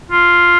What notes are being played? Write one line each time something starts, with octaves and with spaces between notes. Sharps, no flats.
F4